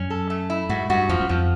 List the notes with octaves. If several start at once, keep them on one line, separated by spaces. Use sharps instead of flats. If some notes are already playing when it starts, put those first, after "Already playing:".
Already playing: F#2 C#4
A4
A3
E4
G#2 F#4
G2 F#4
F2 F3
F#2
F2 F3